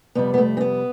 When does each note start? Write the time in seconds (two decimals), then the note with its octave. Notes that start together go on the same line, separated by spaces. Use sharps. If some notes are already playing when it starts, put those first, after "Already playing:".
0.15 F2 C3 G3 B3
0.34 B3
0.38 A3
0.57 C4
0.61 B3